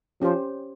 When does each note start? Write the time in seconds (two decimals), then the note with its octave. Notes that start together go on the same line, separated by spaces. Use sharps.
0.21 F3 C#4 G4 C5